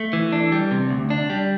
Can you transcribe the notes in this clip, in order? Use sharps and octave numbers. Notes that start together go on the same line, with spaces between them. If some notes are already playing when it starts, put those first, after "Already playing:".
Already playing: A3
E3
D4
G3
C3
D2
D4
G3